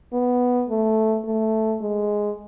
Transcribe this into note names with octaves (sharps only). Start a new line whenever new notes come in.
B3
A3
A3
G#3